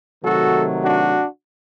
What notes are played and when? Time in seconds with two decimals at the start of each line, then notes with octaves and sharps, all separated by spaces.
0.23 C3 D#3 F#3 A3 F#4 A4
0.83 D4 F#4